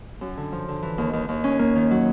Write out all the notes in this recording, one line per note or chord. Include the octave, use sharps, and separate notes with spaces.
F#2
D3
F3
D3
E3
D#2
D#2
D#2
C#4
A#3
D#3
F#3